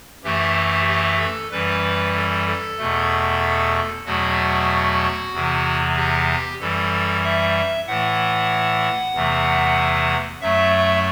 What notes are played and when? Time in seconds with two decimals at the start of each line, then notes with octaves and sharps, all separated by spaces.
0.24 F#2 E3 A3 G4
0.88 G4
1.19 A4
1.52 F#2 E3 G3 B4
2.15 A4
2.47 A4
2.79 E2 B2 A3
4.06 E2 B2 F#3 A3 F#4
5.33 E2 C3 E3
5.96 G4
6.60 F#2 E3 G3 A4
7.23 E5
7.87 A2 E3 A3 F#5
9.14 E2 C3 E3 A3
10.41 F#2 F#3 A3 E5